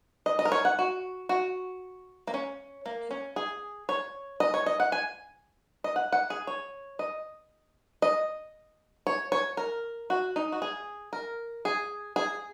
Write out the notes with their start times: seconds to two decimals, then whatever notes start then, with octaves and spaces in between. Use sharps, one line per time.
0.26 D#5
0.39 D#5
0.45 A#4
0.52 C#5
0.65 F#5
0.79 F#4
1.29 F#4
2.27 A#3
2.34 C#4
2.86 A#3
3.11 C#4
3.36 G#4
3.89 C#5
4.40 D#5
4.54 C#5
4.66 D#5
4.80 F#5
4.92 G#5
5.84 D#5
5.96 F#5
6.13 F#5
6.30 G#4
6.47 C#5
6.99 D#5
8.02 D#5
9.07 C#5
9.32 C#5
9.57 A#4
10.10 F#4
10.36 D#4
10.52 F#4
10.62 G#4
11.13 A#4
11.65 G#4
12.16 G#4